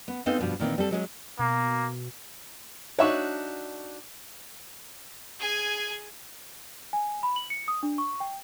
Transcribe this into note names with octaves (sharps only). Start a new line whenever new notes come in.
B3
G#3 B3 C4 D#4 A4 F5
G2 B2 F3
A#2 D#3 E3 C4
G3 C4 A4
F#3 G#3 C#4
B2 A#3
D4 D#4 F#4 C#5 E5 C#6
G#4 G#5
G#5
B5
F#7
C#7
D#6
D4
C#6
G5